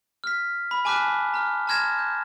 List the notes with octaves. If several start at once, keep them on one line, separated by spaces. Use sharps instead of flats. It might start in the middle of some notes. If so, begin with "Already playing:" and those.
F6 B6
B5
G#5 A5 D6 F6 F#6 B6
A#5 F6
A5 C6 F6 G#6 A#6 E7
G6